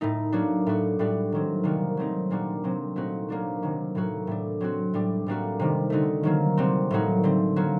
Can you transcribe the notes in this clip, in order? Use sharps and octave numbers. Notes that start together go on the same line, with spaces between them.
A2 A3 D#4
F#3 A#3 D4 F#4
A2 A3 D4 F#4
A2 G3 D4 F#4
D#3 F#3 C4
C3 D#3 G3 A#3 F#4
F#3 A3 C4 D#4
A#2 G3 A#3 D4 F#4
C3 F#3 C4
A#2 A3 C4 D#4 F#4
F#3 A#3 D4 F#4
C3 D#3 F#3
A2 F#3 A#3 F#4
A2 A3 D4
F#3 C4 F#4
A2 G3 D4
A2 G3 A#3 D4 F#4
C3 D#3 G3
D3 A3 D#4 F#4
D#3 F#3 A#3
C3 G3 C4 F#4
A2 F#3 A#3 D#4 F#4
D3 A3 C4
F#3 A#3 F#4